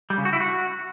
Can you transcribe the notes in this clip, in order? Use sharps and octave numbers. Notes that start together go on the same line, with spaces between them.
G3
C#3
F#4
E4
F#4